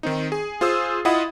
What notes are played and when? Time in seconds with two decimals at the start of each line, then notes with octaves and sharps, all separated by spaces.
0.03 D#3 C4 D#4
0.32 G#4
0.61 F4 G#4 C5 D#6 E6
1.05 E4 F4 D#5 F#5 B5 D#6